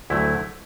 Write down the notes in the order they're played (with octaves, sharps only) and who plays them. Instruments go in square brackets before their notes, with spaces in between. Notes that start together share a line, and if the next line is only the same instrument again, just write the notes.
[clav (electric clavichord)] D2 D3 F#3 A3 E4